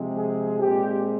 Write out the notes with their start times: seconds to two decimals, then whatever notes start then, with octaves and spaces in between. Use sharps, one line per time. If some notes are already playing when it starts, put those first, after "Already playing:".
Already playing: C3 F3 G#3 C4
0.16 G#4
0.60 A#2 G#3 C4 G4